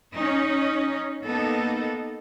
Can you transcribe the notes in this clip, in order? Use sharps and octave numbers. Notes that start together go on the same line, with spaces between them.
C#4 D#4
A#3 B3 D#4 A4